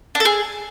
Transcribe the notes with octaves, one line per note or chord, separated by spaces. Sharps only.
D4
A4
G#4